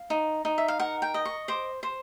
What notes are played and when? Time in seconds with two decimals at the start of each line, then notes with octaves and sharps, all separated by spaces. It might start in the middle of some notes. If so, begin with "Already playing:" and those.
Already playing: F5
0.10 D#4
0.45 D#4
0.58 E5
0.68 F5
0.80 A#4 F#5
1.02 G5
1.14 D#5
1.25 C#6
1.48 C5 D6
1.83 C5